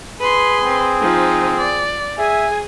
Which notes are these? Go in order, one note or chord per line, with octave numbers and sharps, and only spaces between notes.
G#4 B4 C6
C4
F3 D#4
D5
G#4 E5 G#5